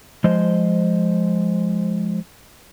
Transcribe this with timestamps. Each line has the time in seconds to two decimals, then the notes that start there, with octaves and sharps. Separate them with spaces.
0.24 F3 G#3 C5 D#5